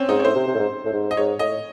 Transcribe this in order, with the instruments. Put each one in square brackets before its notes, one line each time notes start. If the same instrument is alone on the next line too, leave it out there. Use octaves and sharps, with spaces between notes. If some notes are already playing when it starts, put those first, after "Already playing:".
Already playing: [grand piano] C4 C#4
[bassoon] G#2 [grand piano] D#4
[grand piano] C#5
[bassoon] A2 [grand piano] C5
[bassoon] C3
C3
A2
G#2
A2
G#2
[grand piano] D#5
[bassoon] G#2 [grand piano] C#5
[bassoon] A2 [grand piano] D#5